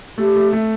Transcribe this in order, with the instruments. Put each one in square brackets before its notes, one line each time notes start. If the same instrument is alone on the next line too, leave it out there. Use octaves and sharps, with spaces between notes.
[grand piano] A3 [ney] G4
[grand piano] A3
A3